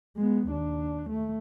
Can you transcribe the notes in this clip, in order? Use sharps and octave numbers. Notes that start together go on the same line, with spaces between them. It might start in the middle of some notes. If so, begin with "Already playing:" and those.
G#3 B3
D#2 D4
A3